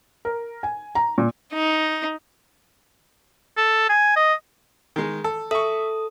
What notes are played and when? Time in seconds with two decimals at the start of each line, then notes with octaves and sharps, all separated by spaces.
0.25 A#4
0.63 G#5
0.95 A#5
1.18 A#2
1.53 D#4
3.57 A4
3.89 G#5
4.17 D#5
4.96 D#3 G#3
5.24 A4
5.51 A4 E5 C#6 D#6